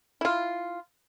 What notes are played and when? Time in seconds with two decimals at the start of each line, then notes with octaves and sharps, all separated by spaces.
0.21 E4 F4